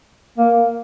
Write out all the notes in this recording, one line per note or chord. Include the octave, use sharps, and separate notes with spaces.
A#3